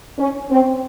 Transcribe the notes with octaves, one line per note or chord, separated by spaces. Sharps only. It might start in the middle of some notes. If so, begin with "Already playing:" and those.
C#4
C4